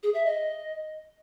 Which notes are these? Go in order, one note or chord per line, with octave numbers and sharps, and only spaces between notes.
G#4
E5
D#5